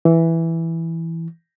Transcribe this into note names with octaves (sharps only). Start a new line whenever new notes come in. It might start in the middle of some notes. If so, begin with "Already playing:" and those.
E3